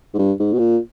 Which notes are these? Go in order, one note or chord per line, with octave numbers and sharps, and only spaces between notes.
G#2
G2
G#2
B2
A#2